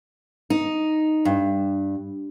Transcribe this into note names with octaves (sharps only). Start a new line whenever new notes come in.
D#4
G2